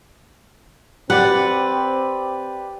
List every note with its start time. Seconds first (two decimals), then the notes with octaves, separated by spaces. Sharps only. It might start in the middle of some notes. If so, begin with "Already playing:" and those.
1.10 C4 G4 B4 D5 F#5